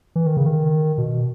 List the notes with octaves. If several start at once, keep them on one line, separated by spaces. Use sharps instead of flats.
E3
D#3
C#3
D#3
B2